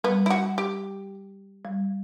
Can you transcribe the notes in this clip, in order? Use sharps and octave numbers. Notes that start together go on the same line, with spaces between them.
G3 B3
E4
F#4
G4
G3